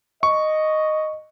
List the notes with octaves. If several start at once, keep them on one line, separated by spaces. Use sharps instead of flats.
D#5 C#6